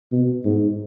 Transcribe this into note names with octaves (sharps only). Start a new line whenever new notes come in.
B2
G#2